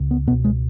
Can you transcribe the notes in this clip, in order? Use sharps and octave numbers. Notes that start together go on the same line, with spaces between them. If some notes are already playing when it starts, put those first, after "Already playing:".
Already playing: C#2 C#3
B3
C#2 B2 B3
G#3